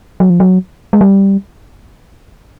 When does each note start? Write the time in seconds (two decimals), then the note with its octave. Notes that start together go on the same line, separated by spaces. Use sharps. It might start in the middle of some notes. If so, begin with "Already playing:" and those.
0.20 F#3
0.30 F3
0.40 F#3
0.93 G#3
1.01 G3